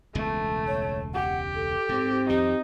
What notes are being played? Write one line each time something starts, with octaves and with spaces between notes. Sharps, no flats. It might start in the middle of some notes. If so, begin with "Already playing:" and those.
E1 C#2 B2 A3
C#5
G4 F#5
A4
G#2 C4
F2 D#3 D#4 G4